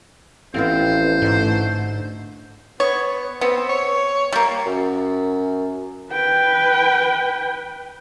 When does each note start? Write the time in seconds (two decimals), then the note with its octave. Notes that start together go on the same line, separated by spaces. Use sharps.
0.54 A1 F3 B3 C4 F4 C5
1.22 G#2 D3 A3
2.80 B3 C#5
3.41 B3 C4
3.69 C#5
4.33 G3 A#3 C#5
4.66 F#2
6.12 B4 G5